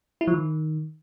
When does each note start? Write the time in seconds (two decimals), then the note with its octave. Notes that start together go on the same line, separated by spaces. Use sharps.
0.21 E4
0.27 F3
0.34 D#3